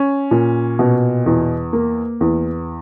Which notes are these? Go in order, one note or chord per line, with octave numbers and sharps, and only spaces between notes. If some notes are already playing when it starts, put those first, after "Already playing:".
Already playing: C#4
A#2
B2
E2
A#3
E2